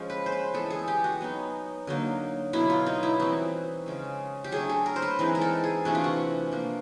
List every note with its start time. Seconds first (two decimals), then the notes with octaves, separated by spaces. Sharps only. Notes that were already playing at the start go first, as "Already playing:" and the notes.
Already playing: F3 G#3 C#4
0.10 B4
0.26 C5
0.32 B4
0.54 E3 G#3 B3 A4
0.70 G#4
0.88 G4
1.04 F#4
1.21 F#3 B3 D#4
1.87 D3 F#3 A#3 D#4
2.53 B2 F#3 B3 E4
2.70 F4
2.86 D#4
3.03 E4
3.20 E3 G3 C4 D#4 F#4
3.86 C#3 F3 G#3
4.44 G4
4.52 F#3 A3 D4 G#4
4.69 A4
4.86 A#4
4.96 C5
5.02 B4
5.19 E3 G#3 C4 D#4
5.35 A#4
5.41 A4
5.64 G#4
5.85 C3 E3 A3 D4 F#4
5.95 F4
6.04 F#4
6.51 F3 A#3 D4